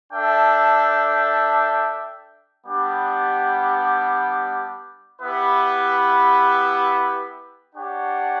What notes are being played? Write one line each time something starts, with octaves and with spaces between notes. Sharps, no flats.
D4 A4 E5 G5
G3 B3 D4 G4
B3 E4 G4 B4
D4 G4 C#5 F#5